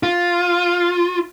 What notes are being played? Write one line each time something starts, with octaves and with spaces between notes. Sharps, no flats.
F4